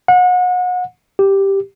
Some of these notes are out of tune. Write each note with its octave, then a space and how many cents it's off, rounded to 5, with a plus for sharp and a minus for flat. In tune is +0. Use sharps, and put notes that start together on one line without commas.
F#5 -35
G4 +0